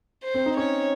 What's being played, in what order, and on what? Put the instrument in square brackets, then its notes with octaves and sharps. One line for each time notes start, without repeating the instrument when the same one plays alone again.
[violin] C5
[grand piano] C4
D#4
[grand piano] C#4 [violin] C#5